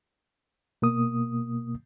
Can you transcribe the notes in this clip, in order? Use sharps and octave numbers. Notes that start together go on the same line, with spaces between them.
B2 A#3 D#6